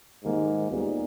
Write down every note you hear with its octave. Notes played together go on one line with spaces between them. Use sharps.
G#2 D#3 G3 A#3
A#2 G3 B3 D#4 G4